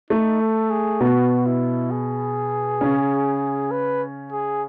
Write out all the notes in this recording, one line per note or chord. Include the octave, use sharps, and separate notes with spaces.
A3 D#4
A4
G#4
B2 B3 F#4
E4
G#4
C#3 C#4
B4
G#4